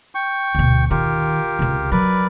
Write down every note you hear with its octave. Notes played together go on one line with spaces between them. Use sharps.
G5 C#6
D2 B2
D#3 F4 G4 A#4
C#2 C3
F#3 A#4 B4 D5